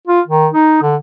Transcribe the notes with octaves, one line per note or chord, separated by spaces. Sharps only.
F4
D#3
D#4
D3